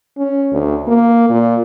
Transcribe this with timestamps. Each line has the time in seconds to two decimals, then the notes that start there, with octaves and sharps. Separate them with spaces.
0.17 C#4
0.52 D2
0.87 A#3
1.30 A#2